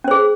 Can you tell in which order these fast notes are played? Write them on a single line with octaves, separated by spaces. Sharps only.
C#4 C5 G#4